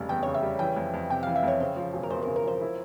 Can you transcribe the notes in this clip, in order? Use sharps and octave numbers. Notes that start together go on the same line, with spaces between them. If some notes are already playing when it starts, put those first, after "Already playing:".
Already playing: F1 C#3 G3
E2 G5
C#3 C#5
E5
G3
E3 G5
F2
F2
C3 G5
F5
E3
E5
F2 C#5
C#3 C5
F3
E1
A#4
E2 C5
A#4
C#3
A#4
F3 C5
E4